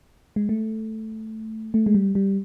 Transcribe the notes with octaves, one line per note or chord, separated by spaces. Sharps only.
G#3
A3
A3
G#3
G3
G3